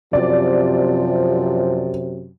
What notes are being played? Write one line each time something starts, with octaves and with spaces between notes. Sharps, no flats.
F#2 C3 F3 D5